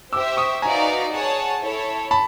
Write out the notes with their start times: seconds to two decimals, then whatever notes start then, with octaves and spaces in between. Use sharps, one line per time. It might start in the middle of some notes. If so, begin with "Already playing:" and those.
0.13 G4 C5 E5 D6 E6
0.37 C#6 D#6
0.62 D#4 F#4 B4 D5 F5 G#5 A#5
1.11 G#4 C#5 F#5 A5
1.62 E4 A4 C#5
2.11 A5 B5